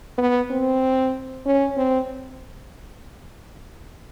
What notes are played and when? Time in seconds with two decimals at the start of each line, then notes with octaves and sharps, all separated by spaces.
0.18 B3
0.51 C4
1.46 C#4
1.77 C4